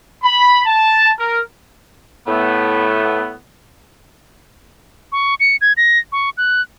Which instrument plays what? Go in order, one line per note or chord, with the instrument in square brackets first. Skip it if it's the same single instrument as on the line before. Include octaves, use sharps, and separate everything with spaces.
[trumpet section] B5
A5
A#4
[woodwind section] A2 A3 B3
[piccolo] C#6
C#7
G#6
A#6
C#6
F#6